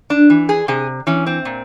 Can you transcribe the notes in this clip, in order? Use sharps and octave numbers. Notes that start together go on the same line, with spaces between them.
D4
E3
G#4
C3 G#4
E3 C#4
C4
A#2